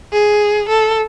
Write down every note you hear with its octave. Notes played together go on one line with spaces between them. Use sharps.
G#4
A4